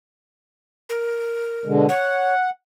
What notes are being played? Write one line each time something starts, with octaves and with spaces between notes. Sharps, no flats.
A#4
B2 D3 G#3
C#5 F#5